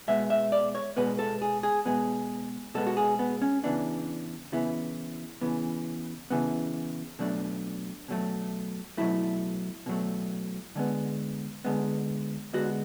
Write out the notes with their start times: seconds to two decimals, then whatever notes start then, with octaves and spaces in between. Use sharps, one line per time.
0.08 B2 G#3 B3 E5
0.30 E5
0.52 D5
0.75 C#5
0.97 B2 G#3 B3 B4
1.19 A4
1.42 G#4
1.63 G#4
1.86 B2 G#3 B3 G#4
2.74 B2 G#3 B3 A4
2.87 F#4
2.97 G#4
3.19 B3
3.42 C#4
3.64 C#3 E3 B3 D4
4.52 C#3 E3 B3 E4
5.41 C#3 E3 B3
6.30 C#3 E3 B3
7.19 B2 F#3 A3 D4
8.08 B2 F#3 A3
8.97 B2 F#3 A3 E4
9.86 B2 F#3 A3
10.75 D3 G#3 B3
11.65 D3 G#3 B3
12.53 D3 G#3 B3 F#4